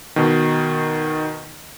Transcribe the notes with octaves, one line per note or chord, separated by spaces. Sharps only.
B2 D#3